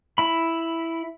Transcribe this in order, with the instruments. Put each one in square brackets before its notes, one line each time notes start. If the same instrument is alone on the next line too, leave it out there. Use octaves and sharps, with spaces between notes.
[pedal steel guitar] E4 B5